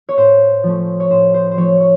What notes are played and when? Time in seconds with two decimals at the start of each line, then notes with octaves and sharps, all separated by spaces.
0.09 C#5
0.17 A2 C5
0.63 F3 A3 C#4
1.00 C#5
1.11 A2 C5
1.34 C5
1.51 C5
1.57 F3 A3 C#4 C#5
1.81 C#5